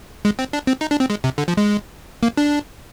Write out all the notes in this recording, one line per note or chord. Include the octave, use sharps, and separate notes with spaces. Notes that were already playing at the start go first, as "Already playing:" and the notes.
G#3
C4
D4
C4
D#4
D4
C4
G#3
C3
D3
F3
G#3
A#3
D4